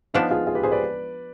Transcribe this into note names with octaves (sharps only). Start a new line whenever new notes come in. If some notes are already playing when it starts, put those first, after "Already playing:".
F3 B3 D4 D#4
F4 G#4
F4 G#4
G4 B4
G#4 C5
B4 D5